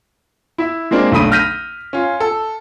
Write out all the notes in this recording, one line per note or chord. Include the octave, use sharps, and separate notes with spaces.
E4 E5
G#3 A#3 C4 D4 F4
B1 D3 A3 B5 D#6 D#7
F6 G6 A#6 B6 D#7
C#4 F4
A4